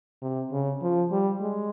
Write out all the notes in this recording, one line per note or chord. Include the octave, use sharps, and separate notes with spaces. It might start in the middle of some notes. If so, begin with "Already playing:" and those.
C3
C#3
F3
G3
G#3